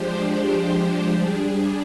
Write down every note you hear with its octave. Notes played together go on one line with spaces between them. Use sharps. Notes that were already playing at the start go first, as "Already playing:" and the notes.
Already playing: F3 G#3 D4 G4 C5
G3 D4 G#4